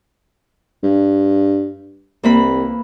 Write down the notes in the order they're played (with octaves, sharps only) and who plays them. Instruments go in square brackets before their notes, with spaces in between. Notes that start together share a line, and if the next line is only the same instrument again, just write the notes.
[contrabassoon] G2
[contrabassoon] C2 [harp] E3 A#3 B5